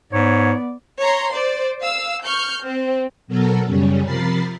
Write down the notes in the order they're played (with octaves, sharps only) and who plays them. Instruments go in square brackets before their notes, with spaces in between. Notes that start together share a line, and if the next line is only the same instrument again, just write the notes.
[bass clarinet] G#2 [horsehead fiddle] B3 D5 [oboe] C#5
[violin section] C#5 A#5 C6
C5 D5
F5 E6
C#6 F6 G6
C4
[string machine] B2 F#3 B3 A4 A#4
F#2 C#3 G3 C#4
C3 F3 A#4 B5 A6 C7